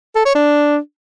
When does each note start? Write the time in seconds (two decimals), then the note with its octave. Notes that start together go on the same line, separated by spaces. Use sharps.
0.16 A4
0.25 C#5
0.35 D4